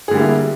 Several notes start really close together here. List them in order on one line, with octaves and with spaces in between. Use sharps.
G#4 D3 G3 A#3 E4